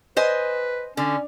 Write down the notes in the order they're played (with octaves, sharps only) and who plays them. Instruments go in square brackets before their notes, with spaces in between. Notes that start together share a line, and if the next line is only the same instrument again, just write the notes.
[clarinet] B4 [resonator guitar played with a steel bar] C5 D#5 G#5
[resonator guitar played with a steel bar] D3 [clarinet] C#4